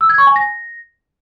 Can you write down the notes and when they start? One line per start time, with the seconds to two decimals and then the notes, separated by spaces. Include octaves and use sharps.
0.01 E6
0.09 G#6
0.18 C#6
0.27 G#5
0.36 A#6